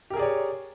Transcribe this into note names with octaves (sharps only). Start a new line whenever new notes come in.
G4 G#4 A#4 C#5 D5